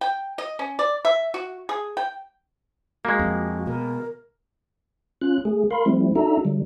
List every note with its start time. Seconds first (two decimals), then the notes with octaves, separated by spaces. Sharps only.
0.01 G5
0.38 D#5
0.59 C#4
0.79 D5
1.05 E5
1.34 F#4
1.69 G#4
1.97 G5
3.05 G#3 A#3 F#4
3.19 F2
3.67 B2 A#4
5.21 C#4 F4 F#6
5.45 A3 G#4
5.71 A#4 F5 B5 C6
5.86 F3 G3 A3 C4 E4
6.15 D4 D#4 F#4 A4 E5 A#5
6.45 D3 F#3 G3